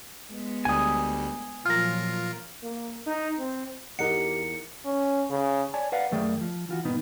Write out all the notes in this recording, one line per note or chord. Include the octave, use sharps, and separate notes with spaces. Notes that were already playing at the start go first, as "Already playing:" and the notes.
G#3 B3
D2 G3 G#5 D#6
A#2 F3 F#3 F4 A#4 F6 A#6
A#3
D#4
C4
E2 D#4 G4 A#4 D#5 F#5 C#7
C#4
C#3
C#5 D5 G#5 A5
B4 D5 F5 F#5
F#2 D#3 A3 G#4 D5 G5
F3
E3 F4 F#4
G2 A#2 D#3 B3 D#4